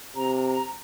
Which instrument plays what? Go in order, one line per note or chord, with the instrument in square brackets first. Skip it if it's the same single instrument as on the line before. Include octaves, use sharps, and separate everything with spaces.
[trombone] C3 [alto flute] A#5